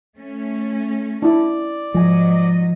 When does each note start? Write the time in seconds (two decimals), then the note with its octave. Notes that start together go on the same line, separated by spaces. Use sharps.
0.17 A3 C#4
1.22 D4 E4 D5
1.94 G#2 F3 F#3 G#3 D#5 G#5